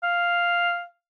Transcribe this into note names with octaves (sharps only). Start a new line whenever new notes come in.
F5